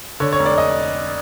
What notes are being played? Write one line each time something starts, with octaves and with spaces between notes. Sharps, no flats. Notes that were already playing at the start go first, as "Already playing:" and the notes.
D3 C#5
C#5
F1
D5
D#5